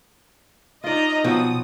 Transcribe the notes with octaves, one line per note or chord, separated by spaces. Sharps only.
D#4 F4 D5 D#5 A#5
B2 F3 F#3 C4 D#6